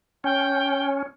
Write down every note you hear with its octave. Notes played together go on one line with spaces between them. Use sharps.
C#4 G5